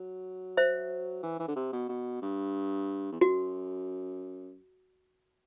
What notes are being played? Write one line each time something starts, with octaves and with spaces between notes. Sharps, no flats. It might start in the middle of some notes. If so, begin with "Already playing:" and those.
Already playing: F#3
C5 E5
E3
E3
D3
C3
B2
B2
G2
E2
F#2 F#4